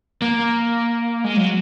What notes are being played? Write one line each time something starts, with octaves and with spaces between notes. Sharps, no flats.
A#3
G#3
F#3